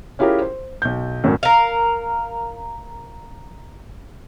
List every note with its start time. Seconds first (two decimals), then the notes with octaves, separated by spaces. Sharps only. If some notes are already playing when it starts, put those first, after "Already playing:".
0.19 C#4 E4 F4 G4 G#4 A#4
0.42 C5
0.82 B1 G6
1.24 G#1 F#2 A2
1.43 A#4 F5